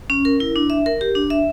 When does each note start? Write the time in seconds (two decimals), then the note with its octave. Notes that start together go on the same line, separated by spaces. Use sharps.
0.10 C#4
0.25 A#4
0.40 E4
0.56 D4
0.70 E5
0.86 A#4
1.01 G4
1.15 D4
1.30 E5